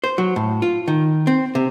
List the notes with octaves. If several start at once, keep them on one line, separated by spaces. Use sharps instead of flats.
C5
F#3
A2
F4
D#3
C4
C3